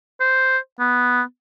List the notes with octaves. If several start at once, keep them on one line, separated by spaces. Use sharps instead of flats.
C5
B3